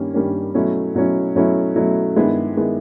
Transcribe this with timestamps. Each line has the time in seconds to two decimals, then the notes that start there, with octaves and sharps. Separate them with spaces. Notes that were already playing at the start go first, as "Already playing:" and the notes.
Already playing: G2 D#3 G3 A#3 C#4
0.14 G2 D#3 G3 A#3 C#4
0.54 B2 F#3 A3 C#4 E4
0.95 B2 F#3 A3 C#4 E4
1.36 B2 F#3 A3 C#4 E4
1.76 B2 F#3 A3 C#4 E4
2.16 G2 D#3 G#3 B3 E4
2.57 D#3 G#3 B3 E4